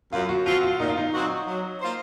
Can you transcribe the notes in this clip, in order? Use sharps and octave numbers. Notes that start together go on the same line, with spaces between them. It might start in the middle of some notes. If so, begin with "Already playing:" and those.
F#2 F4
F#4
F3 C4 F4 F#4
F4
A#2 D#4
F4
D#4
F#3 C4 F#4
F#3
A#3 F4 C5